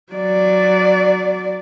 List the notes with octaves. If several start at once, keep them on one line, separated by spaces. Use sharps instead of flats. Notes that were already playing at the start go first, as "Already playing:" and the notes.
F#3 D5